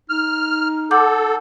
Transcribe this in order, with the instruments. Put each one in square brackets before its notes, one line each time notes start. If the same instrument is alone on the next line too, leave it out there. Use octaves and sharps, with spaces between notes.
[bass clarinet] D#4 [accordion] F6
[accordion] A4 [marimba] F#5 D6 G6